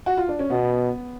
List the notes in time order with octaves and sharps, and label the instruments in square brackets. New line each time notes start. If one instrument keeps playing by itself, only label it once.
[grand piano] F#4
F4
D4
C#4
[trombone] B2 [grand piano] B3